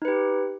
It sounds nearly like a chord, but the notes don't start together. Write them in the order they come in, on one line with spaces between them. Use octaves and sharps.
D#4 B4 G4